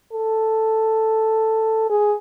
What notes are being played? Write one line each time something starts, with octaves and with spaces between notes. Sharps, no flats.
A4
G#4